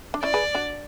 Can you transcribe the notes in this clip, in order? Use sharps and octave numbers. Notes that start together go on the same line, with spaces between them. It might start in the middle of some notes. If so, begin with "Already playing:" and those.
D4
C#4 E4 D5
G#4 B4
D4 F#4